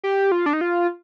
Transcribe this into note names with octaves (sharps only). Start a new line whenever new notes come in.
G4
F4
D4
D#4
F4